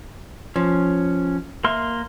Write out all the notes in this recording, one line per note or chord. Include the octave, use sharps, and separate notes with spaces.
F3 C#4
A#3 E5 C6 F6